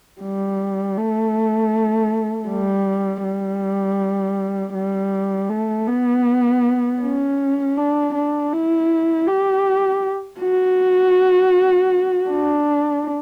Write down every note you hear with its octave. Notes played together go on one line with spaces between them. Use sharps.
G3
A3
G3
G3
G3
A3
B3
C#4
D4
D4
E4
G4
F#4
D4